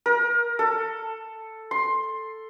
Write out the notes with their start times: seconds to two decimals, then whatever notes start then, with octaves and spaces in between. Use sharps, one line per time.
0.06 A#4
0.59 A4
1.71 C6